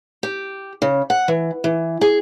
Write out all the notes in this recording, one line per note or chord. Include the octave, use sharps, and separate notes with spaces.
G4
C#3
F#5
E3
E3
G#4